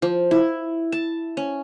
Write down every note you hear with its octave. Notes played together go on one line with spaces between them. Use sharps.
F3
E4
A5
C#4